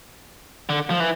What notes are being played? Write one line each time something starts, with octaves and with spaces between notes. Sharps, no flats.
D3
F3
E3